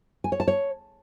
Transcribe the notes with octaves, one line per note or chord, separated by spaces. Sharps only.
G#5
C#5
A5
C#5